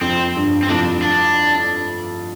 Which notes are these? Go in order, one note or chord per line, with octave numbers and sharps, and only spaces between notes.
F2 C4
G2
C4
F2 A2 D4
D4